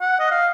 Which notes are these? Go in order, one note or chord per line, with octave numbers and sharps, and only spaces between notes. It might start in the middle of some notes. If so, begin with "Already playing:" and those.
F#5
D#5
F5